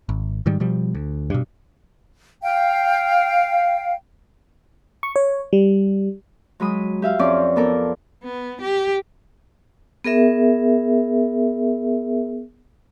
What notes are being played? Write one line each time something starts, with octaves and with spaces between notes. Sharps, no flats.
G#1
G#2 D#3 G3
B2 F3 G3
D2
G2 B2
F5 G5
C#6
C#5
G3
F#3 G#3 B5 D#6
G4 E5 F5
F2 C4 C#4 D5 D6
B3 A4 A#4 D6
B3
G4
B3 G#4 A#4 E5